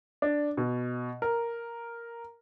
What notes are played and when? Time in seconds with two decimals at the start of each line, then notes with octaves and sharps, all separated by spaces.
0.22 D4
0.57 B2
1.22 A#4